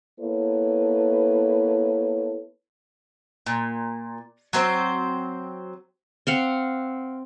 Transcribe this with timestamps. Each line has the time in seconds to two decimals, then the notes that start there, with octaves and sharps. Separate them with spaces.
0.19 A#3 B3 E4 A4 B4 C#5
3.46 A#2
4.53 F#3 C4 C5
6.27 C4 F5 F#5